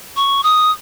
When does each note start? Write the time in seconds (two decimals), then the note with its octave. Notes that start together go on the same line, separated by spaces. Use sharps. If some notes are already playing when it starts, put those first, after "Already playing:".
0.16 C#6
0.43 D#6